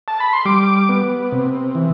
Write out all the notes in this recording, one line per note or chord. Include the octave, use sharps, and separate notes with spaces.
A5
B5
C6
G3 D6
B3
C3
E3